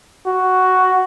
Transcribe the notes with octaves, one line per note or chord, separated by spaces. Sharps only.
F#4